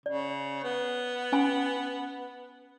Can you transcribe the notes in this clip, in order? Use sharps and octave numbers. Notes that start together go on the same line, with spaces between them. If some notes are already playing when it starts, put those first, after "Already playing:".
C#3 D5
B3
C#4 G#5 B5